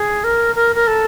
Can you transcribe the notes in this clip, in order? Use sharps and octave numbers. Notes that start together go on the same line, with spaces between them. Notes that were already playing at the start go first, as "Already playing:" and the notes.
Already playing: G#4
A#4
A#4
A#4
A4